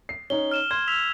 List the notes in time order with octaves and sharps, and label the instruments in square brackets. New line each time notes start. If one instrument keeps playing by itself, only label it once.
[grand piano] C7
[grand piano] C#4 D#4 [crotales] G7
[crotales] F6 E7 G7
[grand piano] C6 [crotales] G#6
[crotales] E6 B6 F7